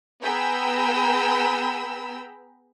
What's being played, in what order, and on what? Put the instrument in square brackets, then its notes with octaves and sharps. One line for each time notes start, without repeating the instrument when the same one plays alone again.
[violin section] B3 G#4 G5 A#5 B5 E6